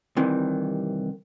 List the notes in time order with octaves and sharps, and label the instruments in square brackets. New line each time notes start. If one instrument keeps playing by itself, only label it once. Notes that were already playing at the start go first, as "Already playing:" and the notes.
[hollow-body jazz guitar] C2 C3 D#3 E3